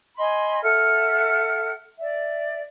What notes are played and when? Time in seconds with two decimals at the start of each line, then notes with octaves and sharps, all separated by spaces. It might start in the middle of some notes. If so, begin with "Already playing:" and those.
0.16 D#5 G#5 B5 C6
0.62 A4 E5 F#5 F6
1.99 D5 E5